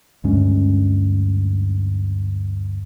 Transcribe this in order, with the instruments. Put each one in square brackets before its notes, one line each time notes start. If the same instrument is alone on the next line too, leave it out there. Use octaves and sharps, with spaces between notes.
[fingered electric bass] D2 G2 G#3 C#4